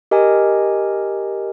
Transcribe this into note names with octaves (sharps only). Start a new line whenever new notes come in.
G4 A#4 D#5 G#5